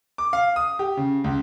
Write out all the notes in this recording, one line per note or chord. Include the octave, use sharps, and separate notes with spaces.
D6
F5
D#6
G4
C#3
C#2